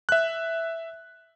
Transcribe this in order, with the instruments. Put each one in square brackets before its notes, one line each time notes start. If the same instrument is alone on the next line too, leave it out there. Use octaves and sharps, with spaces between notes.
[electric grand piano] E5 F#6